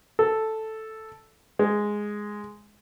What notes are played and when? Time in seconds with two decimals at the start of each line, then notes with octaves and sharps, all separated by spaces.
0.19 A4
1.59 G#3